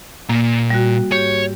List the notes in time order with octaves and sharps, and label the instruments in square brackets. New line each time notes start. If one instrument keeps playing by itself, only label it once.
[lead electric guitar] A#2 [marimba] A#3
[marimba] G3 F#4
[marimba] G#2 G4 [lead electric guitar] C#5